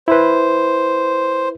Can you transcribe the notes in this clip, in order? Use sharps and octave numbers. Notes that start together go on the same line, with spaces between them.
E4 B4 C5